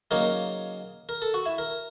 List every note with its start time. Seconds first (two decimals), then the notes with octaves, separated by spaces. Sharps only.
0.11 C#3 F#3 A#3 D#4 A#4
1.09 A#4
1.22 A4
1.34 F#4
1.46 E4
1.58 A#4